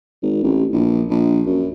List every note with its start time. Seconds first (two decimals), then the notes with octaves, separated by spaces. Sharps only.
0.23 G#1
0.43 A1
0.73 A#1
1.10 A#1
1.47 F#2